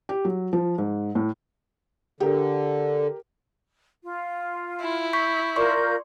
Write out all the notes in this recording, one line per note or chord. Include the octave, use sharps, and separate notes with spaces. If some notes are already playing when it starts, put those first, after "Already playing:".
G4
F#3
F3
G#2
A2
D3 G4 A#4
F4
E4
C#6 G6 B6
F4 A#4 D5 C6 C#6 G6